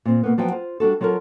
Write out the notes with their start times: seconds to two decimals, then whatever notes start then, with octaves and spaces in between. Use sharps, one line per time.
0.05 A#2 C4
0.23 B2 A#3 B3
0.38 F3 F#3 B3 G5
0.52 F4 C5
0.80 G3 D4 F#4 A4
1.01 F#3 F4 G4 A4 A#4